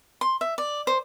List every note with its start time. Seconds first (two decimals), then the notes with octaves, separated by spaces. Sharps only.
0.21 C6
0.41 E5
0.58 D5
0.87 C5